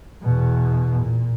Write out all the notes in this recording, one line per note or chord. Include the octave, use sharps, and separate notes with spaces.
E2 B2
A#2